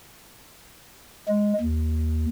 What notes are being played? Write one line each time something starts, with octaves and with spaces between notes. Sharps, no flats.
G#3
D#2